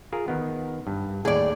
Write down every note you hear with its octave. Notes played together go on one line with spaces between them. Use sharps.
F4 G#4 A#4
D#3 B3
G2
D#2 A2 G#4 D5